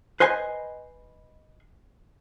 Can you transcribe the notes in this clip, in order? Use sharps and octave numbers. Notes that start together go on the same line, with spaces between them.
B4 C5 D#5 G#5